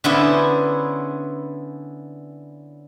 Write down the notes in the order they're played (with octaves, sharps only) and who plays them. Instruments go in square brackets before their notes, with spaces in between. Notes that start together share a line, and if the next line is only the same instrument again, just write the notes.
[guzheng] D3 B3 C#4 E4 G#4 C5